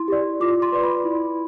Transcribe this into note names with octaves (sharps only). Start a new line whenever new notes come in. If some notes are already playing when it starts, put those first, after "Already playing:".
Already playing: E4 C6
G4 D5
F4 D6
C6
B4 D5
B5
E4